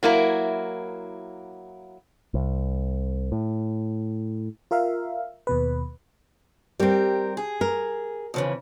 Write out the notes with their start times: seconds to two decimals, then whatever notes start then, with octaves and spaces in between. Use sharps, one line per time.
0.03 F#3 A#3 E4 A#4
2.34 C2
3.32 A2
4.71 F4 A#4 E5 F5
5.47 D#2 B2 B4
6.80 G3 C4 G4 A#4
7.37 G#4
7.61 A#4
8.34 F2 C#3 E3